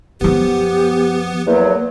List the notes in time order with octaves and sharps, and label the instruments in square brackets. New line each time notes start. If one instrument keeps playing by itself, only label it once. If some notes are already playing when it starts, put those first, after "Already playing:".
[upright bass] F#2 F3 [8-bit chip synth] B3 [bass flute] G4
[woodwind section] E2 F#3 [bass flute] A#3